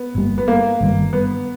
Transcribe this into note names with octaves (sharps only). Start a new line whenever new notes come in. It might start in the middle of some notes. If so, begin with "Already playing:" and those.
Already playing: B3
G1 G2 G3 A#3
B3
A#3
G1 G2 D#3 G3
B3